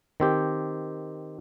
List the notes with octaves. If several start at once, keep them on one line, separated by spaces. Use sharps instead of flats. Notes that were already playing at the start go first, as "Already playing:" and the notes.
D#3 C4 G4